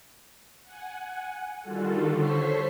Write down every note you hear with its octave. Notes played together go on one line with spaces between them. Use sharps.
F#5 G#5
D3 D#3 G3 F4 F#4 A4
A4 C5 C#5 C#6 B6 C7